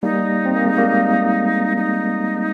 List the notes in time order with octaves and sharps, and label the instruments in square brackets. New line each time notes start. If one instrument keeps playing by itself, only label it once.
[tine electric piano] G3 A#3 [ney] D#4
[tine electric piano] C4
A#3
G#3
G3 A#3
[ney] D#4